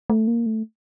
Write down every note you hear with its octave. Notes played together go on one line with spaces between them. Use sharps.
A3
A#3
A3